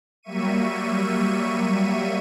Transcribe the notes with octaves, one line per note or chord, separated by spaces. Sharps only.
F#3 G3 A#3 E5 C#6 D#7